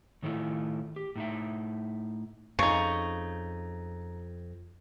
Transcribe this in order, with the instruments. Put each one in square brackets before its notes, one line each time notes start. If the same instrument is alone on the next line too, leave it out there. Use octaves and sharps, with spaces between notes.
[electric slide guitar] A2 D#3 A3 C#4 E4 F4
G4
A2 D#4 E5
[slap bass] F2 [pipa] C#3 D#4 [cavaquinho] C#6